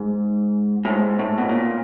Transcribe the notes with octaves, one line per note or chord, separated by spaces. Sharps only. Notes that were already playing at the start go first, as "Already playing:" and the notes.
Already playing: G#2
A2
G#2
A2
B2
A#2